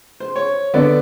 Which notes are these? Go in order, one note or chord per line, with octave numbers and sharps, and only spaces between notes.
C5
C#5
D3 B3 D5